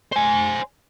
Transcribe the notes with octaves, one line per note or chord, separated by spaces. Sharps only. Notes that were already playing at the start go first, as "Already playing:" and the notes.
C5 G#5